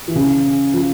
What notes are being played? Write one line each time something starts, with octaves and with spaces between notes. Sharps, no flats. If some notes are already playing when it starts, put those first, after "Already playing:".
E3
C#3
F3